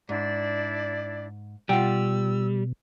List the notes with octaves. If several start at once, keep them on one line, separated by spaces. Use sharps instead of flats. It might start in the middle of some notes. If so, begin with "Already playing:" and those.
G#2 D4 E4 D5
B2 G3 F4 F#5 G5 E6